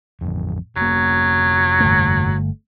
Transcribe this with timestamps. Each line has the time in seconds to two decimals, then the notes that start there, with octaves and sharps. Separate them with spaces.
0.21 A1 F2
0.76 F1 F#3 A#3
1.80 G1 A3